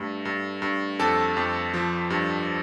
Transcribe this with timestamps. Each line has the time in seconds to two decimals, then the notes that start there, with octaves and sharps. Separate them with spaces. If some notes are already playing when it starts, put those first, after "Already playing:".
Already playing: G2 A3
0.25 G2
0.62 G2
0.99 F2 A4
1.37 F2
1.74 F3
2.10 G2